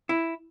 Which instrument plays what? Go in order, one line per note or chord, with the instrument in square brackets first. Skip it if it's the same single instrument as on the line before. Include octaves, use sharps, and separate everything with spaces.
[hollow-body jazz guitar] E4